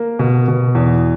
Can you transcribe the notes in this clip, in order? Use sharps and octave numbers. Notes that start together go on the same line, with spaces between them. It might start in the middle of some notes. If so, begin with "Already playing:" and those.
Already playing: A#3
B2
B2
E2